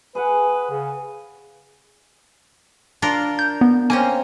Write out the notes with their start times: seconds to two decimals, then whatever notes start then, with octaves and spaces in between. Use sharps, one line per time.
0.15 G#4 B4 F#5
0.70 C#3
3.02 D4 F4 A#4
3.39 G6
3.61 B3
3.90 A#3 C4 C#4 G#5